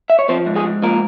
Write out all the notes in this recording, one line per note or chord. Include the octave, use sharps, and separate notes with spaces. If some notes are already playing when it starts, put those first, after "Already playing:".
E5
C#5
F3 C4 C5
G#2
G#3 G#4
G#2
F3 A#3 A#4